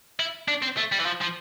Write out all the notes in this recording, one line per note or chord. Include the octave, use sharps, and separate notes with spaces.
E4
D4
C4
A3
G3
E3
F3
F3